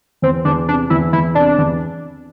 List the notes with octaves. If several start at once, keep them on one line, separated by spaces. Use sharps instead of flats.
E2 C4
E2 D4
C3 D4
E2 E4
E2 E4
C3 D4
E2